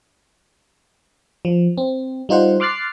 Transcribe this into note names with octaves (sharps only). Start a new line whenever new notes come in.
F3
C4
G3 D#4 F4 C5 F#5
C6 D6 F6 F#6 A6 C7